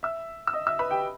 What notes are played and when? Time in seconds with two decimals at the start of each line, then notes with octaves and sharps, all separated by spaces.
0.03 E5 E6
0.47 E6
0.53 D#5 D#6
0.67 E5 E6
0.79 B4 B5
0.91 G4 G5